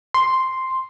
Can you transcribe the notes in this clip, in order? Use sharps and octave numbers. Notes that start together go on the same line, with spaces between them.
C6